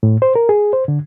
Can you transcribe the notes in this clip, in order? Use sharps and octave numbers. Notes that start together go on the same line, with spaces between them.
A2
C5
A#4
G#4
C5
D3